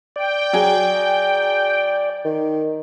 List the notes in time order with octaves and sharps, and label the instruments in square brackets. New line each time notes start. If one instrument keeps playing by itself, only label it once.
[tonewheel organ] D5 [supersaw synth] G5
[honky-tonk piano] F#3 G#4
[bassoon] D#3